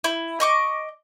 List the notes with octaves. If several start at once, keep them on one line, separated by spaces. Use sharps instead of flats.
E4
D#5 C#6 D6